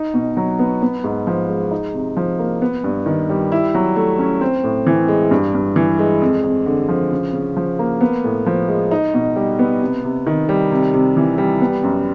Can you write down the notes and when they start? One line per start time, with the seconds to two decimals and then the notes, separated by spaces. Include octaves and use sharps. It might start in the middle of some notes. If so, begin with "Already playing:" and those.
Already playing: D#4
0.14 B2
0.37 F#3
0.59 B3
0.82 B3
1.04 G#2
1.27 F3
1.49 G#3
1.71 D#4
1.94 C3
2.17 F3
2.39 A#3
2.62 B3
2.84 G2
3.06 D#3
3.29 G3
3.52 E4
3.75 F#3
3.96 A3
4.19 C#4
4.41 C4
4.64 A2
4.87 E3
5.08 G#3
5.31 G2
5.54 G2
5.76 E3
5.99 G#3
6.21 F2
6.43 F2
6.66 D3
6.89 F3
7.12 C#3
7.33 C#3
7.57 F3
7.79 A#3
8.01 B3
8.24 A2
8.46 F3
8.68 G#3
8.91 D#4
9.14 B2
9.36 G3
9.59 B3
9.81 C3
10.04 C3
10.27 D#3
10.49 G3
10.72 C3
10.94 C3
11.17 E3
11.38 G3
11.61 B3
11.83 F#2